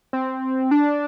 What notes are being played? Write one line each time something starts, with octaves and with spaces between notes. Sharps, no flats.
C4
D4